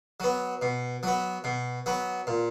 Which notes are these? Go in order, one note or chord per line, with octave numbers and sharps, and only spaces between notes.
F#3 B3
B2
F#3 B3
B2
F#3 B3
A#2